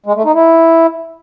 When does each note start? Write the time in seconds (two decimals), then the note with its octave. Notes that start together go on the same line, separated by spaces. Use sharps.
0.06 G#3
0.16 A3
0.25 D#4
0.34 E4